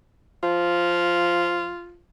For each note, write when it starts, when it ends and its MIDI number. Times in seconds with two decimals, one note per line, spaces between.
0.43 1.72 53
0.43 2.00 65